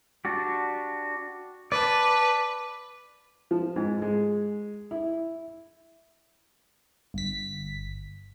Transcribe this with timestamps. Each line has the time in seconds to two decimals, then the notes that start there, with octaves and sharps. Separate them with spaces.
0.25 D4 F#4 G4
1.72 B4 D5 A5
3.51 F3
3.76 G#2
4.02 G#3
4.91 E4
7.14 G1 B6